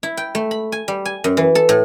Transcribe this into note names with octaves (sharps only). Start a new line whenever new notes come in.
E4
G5
A3
B5
G#5
G3
G#5
F#2
E3
A4
A2